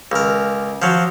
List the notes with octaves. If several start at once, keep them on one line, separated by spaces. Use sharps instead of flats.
C#2 A#4
F3 F#3